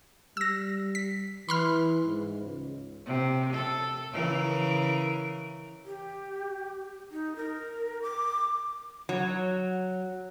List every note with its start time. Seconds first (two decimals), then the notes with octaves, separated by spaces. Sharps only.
0.37 G3 E6 A#6
0.95 B6
1.49 E3 B5 C6 F6
2.06 G#2
2.42 C#2
3.06 C3
3.53 A4
4.12 C#3 E3 A#4
5.85 G4
7.11 D#4
7.36 A#4
8.02 D6
9.09 F#3